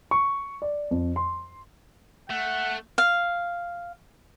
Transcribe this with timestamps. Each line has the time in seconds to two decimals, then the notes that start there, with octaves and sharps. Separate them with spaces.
0.11 C#6
0.62 D5
0.91 F2
1.16 C6
2.30 A3 F#5
2.98 F5